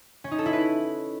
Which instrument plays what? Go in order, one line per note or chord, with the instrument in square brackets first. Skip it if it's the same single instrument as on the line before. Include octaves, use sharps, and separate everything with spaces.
[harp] C#4
D#4
A4
E4
B4